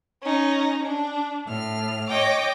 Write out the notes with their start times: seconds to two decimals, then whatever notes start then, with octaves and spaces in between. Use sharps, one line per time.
0.22 C#4 D#4
0.87 D4
1.47 A2 F6
2.10 C#5 D#5 G5 D6